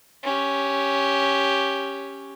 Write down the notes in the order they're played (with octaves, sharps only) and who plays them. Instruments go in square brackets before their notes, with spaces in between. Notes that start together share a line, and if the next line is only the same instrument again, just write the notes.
[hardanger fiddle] C#4 G4